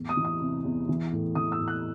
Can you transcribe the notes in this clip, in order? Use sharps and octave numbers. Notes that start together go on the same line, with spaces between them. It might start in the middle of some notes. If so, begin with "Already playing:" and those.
Already playing: E2 A2
D#6
E3
D#6
C3
E2
E3
A2
E3 D#6
E6
A2
F#6